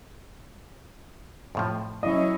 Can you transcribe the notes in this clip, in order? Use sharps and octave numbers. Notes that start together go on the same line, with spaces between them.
F2 A2 F3
F#3 C#4 E4 D#5